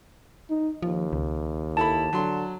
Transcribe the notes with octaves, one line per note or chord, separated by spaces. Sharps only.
D#4
D#2 F3
C#2
E4 A4 A5 B5
D3 F#3 C6